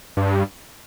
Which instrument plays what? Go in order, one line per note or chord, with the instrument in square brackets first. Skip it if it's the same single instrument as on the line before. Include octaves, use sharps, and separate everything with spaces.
[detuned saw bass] G2